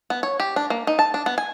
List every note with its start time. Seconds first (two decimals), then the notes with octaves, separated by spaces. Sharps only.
0.10 B3
0.23 C#5
0.40 G4
0.56 D4
0.70 A#3
0.87 D#4
0.99 A5
1.14 D4
1.26 B3
1.38 G#5